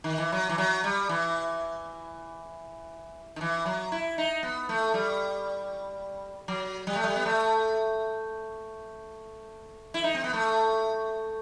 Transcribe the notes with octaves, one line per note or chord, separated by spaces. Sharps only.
D#3
E3
F#3
E3
F#3
G3
E3
D#3
E3
F#3
E4
D#4
B3
A3
G3
F#3
G3
A3
G3
B3
A3
E4
D#4
C4
B3
A3